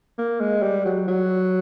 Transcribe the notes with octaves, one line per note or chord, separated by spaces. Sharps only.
A#3
G#3
G3
F#3
F#3